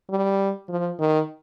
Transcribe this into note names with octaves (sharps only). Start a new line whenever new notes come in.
G3
F3
D#3